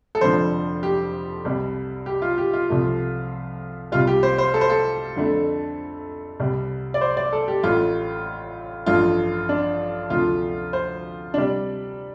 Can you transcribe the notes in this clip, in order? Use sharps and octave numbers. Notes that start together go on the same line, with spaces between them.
A4
F1 F2 D3 F3 C5
G4
C2 C3 G3
G4
F4
G4
F4
C2 C3 F3 A3
C2 C3 G3 F4
G4
C5
C5
A4
C5
A4
F2 D3 A3
C2 C3 G3
D5
C5
D5
A4
G4
A1 A2 A3 F4
A1 G2 F3 A3 F4
D4
D2 C3 F3 A3 F4
C5
D4
C3 G3